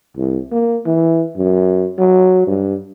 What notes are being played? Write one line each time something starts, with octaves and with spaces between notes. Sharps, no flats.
C2
A#3
E3
F#2
F#3
G2